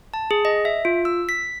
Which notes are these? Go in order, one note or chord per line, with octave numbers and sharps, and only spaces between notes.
A5
G#4
D#5
E5
F4
E6
B6